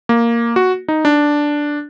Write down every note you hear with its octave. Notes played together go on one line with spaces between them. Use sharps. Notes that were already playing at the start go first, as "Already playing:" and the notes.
A#3
F#4
D#4
D4